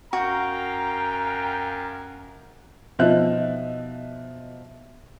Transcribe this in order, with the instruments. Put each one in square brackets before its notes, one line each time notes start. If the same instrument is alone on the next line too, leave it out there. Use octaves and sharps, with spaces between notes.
[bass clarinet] F#2 [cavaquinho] F#4 [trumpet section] F5 G5 A#5
[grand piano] B2 F3 D#4 E5 F#6